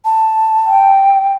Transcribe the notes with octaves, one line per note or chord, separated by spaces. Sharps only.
A5
G5